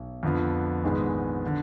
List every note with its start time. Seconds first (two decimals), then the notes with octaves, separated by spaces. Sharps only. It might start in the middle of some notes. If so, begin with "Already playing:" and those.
Already playing: B1
0.23 F2 D3 F3 B3
0.83 A#1 G#2 D#3 G#3 B3
1.46 D3